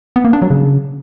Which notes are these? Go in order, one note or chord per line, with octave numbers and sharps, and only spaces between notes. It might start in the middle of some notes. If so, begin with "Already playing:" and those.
B3
A#3
D4
F#3
C#3